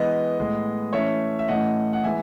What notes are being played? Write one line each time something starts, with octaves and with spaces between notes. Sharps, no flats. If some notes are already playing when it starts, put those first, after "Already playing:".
Already playing: E3 G#3 B3 D#5
A2 G#3 B3
E3 A3 C#4 C#5 E5
E5
A2 E3 A3 C#4 D#5 F#5
F#5
E3 G#3 B3 E5 G#5